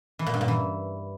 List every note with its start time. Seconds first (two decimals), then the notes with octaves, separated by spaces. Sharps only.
0.19 E3
0.26 A#2
0.34 G2
0.41 A#2
0.48 E3